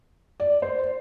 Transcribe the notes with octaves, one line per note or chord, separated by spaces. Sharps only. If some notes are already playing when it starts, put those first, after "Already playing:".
D5
C5